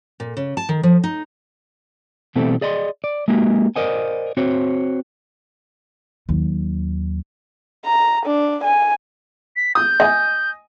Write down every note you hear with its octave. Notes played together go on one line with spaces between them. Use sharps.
A#2
C#3
A5
D#3
F3
D#4
B2 E3 G3 A3 C4 A4
G#4 D5 D#5 A#5 C6
D5
G#3 A#3 D#4 F#4 G4
A#4 C5 D5 D#5 F#5 G#5
C4 F#4 C5 C#5
D#2 F#3
A#5
D4
G#5
B6
D#6 G6
D#5 G#5